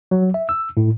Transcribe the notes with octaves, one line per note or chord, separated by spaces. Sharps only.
F#3
E5
E6
A2